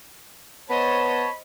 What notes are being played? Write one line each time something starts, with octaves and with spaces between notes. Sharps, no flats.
B3 C5 C#5 D#5 A5 B5